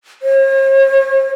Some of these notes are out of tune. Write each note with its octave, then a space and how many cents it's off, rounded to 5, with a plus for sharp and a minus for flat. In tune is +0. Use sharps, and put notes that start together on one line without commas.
C#5 -45